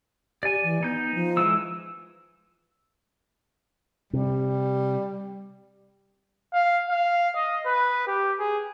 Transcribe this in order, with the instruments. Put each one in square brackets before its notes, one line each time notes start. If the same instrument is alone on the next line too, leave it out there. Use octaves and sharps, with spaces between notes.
[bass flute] G4 [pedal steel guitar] D5 G#5
[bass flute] E3
[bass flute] B3 [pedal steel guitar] D#4 G6
[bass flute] F3
[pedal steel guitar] E3 G#3 E6
[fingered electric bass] C3 [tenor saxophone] G3
[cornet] F5
F5
D#5
B4
G4
G#4